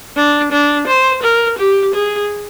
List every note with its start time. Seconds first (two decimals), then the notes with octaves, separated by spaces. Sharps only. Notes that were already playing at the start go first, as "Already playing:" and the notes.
0.16 D4
0.52 D4
0.87 C5
1.23 A#4
1.58 G4
1.94 G#4